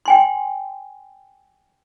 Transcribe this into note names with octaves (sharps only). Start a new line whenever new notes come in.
G5 G#5 C6